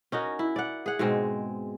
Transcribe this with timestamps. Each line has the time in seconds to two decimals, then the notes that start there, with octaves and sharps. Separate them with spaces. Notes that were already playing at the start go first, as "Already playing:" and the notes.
0.12 C#4 D#4 F#4 A#4
0.39 E4
0.56 D5 F#5
0.86 G#4 F#5
0.99 G#2 B2 G#3 C4